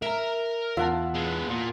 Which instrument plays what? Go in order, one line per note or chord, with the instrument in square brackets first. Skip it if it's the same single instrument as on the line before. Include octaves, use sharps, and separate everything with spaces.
[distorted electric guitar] A#4 A#5 [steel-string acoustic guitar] E5
[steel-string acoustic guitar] E2 [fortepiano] F4 [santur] E5 F#5 A5
[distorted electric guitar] G#3 B3
[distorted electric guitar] A#2 [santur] F4